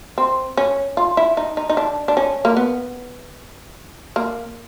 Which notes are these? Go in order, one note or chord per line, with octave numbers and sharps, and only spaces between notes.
C4
C#4
F4
E4
D#4
D#4
D#4
D4
D4
C#4
A#3
B3
A#3